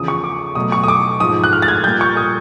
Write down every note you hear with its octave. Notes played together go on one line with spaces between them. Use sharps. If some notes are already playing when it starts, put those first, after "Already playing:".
Already playing: E2 C#3 F3 D#6
C#6
D6
B2 F#3 A3 D#6
C#6
D#6
D6
G#2 F3 G#3 D#6
F#6
F6
A6
G#6
A#2 G3 G6
C#6
D#6